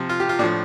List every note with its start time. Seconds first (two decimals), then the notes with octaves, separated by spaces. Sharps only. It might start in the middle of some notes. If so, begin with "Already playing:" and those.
Already playing: C3 F3
0.09 F4
0.20 G4
0.29 F4
0.39 A2 D4
0.43 F3